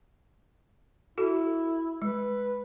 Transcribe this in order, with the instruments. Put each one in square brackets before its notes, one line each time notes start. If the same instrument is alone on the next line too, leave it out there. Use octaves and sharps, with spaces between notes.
[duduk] E4 [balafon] F#4 A4
[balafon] G#3 [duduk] B4